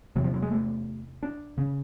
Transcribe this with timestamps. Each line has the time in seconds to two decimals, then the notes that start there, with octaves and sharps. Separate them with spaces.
0.16 E2 C3 F#3
0.24 F3
0.34 F#3
0.42 G#3
0.51 A3
1.23 D4
1.58 C#3